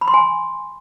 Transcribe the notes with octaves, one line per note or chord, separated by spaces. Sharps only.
B5
C6
G#5